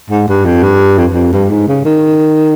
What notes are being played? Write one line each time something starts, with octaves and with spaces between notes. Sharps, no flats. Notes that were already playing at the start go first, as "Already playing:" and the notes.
G#2
G2
F2
G2
F2
F2
G2
G#2
C#3
D#3